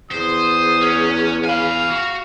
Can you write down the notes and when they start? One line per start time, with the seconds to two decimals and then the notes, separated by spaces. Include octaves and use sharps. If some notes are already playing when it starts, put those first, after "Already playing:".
0.11 E2 C5 D#6
0.81 C#4
1.45 F5 G#5 B5
1.90 F#4